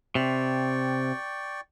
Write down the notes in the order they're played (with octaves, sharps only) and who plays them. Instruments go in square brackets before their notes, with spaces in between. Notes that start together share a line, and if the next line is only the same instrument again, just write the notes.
[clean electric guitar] C3 [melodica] D5 G5 C#6